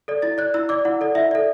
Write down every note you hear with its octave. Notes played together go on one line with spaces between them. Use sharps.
A4 D5
E4 A6
D5 F#6
E4 E6
D5 D6
E4 F#5
A4 D5
E4 E5
A4 D5